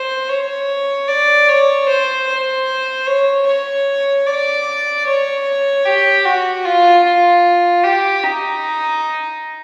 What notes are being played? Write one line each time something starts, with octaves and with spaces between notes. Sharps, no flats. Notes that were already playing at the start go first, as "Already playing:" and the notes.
Already playing: C5
C#5
D5
C#5
C5
C5
C#5
C#5
D5
C#5
G4
F#4
F4
F4
G4
D#4